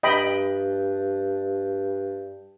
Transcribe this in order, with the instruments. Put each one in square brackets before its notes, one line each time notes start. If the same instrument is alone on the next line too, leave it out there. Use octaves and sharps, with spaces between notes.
[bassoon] G2 [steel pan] D#5 G5 B5